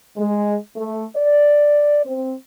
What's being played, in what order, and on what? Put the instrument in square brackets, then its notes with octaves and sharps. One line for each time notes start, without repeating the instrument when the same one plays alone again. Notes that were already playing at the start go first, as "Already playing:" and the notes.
[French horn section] G#3
A3
D5
C4